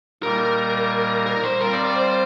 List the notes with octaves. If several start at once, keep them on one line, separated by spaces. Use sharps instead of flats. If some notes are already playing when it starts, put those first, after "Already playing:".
A#2 G3 A#3 D#4 A#4
A#4
C5
G3 C4 F4 A#4
D5
D5
C5